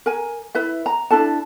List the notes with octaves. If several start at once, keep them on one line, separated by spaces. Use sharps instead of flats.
A#4 G#5
E4 B4 E5
A#5
D4 E4 A4 A5